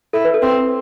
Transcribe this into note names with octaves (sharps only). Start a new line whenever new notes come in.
E4 A4
B4
A4
C4